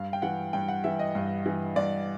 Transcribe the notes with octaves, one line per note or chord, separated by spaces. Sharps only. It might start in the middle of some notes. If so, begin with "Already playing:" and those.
Already playing: G2 F5
G5
E3 F#5
G2 G5
F#5
E3 E5
D#5
G2
E3
G2 D5